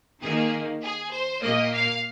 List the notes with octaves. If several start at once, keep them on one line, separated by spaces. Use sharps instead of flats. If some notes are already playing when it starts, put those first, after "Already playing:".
D#3 A#3 G#4
G#4
C5
A#2 A#3 D#5
F5